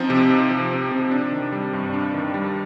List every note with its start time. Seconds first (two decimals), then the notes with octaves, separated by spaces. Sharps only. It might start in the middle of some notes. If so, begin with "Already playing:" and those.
Already playing: F3 C4 D#4
0.10 C3
0.30 D#4
0.50 F3
0.71 C4
0.92 C3
1.11 D4
1.32 D#3
1.52 G3
1.73 G2
1.94 D4
2.14 D#3
2.34 G3